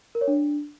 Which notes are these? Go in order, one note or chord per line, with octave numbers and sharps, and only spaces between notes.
A#4
C#5
D4